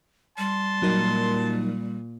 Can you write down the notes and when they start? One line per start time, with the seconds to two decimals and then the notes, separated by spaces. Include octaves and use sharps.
0.38 G3 A5 C6
0.82 A#2 F#3 D#4 A#4